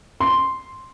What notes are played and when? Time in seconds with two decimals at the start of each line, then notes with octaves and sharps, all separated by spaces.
0.20 C6